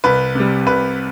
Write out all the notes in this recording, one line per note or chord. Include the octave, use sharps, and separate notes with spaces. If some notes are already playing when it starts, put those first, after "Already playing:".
C2 B4
C3 G3
C2 B4